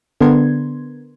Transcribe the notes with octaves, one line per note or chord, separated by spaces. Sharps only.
D3 B3 D4 A#4 C6 G#6